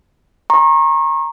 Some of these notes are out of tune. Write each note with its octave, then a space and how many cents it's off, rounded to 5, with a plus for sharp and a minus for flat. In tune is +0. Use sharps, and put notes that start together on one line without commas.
A#5 +0 C#6 -35